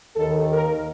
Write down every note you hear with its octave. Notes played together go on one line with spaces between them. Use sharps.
D#2 D#3 A4
A#4